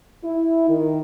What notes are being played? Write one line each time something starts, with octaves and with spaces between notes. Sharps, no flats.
E4
D#3